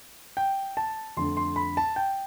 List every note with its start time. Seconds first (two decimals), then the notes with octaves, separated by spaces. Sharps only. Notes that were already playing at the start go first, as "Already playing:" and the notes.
0.37 G5
0.77 A5
1.17 F2 D3 A3 C6
1.37 C6
1.56 B5
1.77 A5
1.96 G5